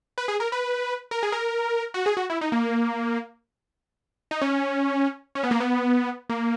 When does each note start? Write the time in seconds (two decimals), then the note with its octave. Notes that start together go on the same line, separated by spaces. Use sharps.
0.18 B4
0.28 G#4
0.40 A#4
0.52 B4
1.11 A#4
1.23 G#4
1.32 A#4
1.94 F#4
2.06 G#4
2.17 F#4
2.30 E4
2.41 D#4
2.52 A#3
4.31 D#4
4.41 C#4
5.35 C#4
5.43 B3
5.51 A#3
5.60 B3
6.30 A#3